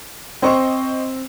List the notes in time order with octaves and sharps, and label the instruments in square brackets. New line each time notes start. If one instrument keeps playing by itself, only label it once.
[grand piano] C4 [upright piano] C5 D#5 C#6